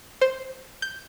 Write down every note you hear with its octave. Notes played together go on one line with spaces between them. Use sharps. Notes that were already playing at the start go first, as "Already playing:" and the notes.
C5
G6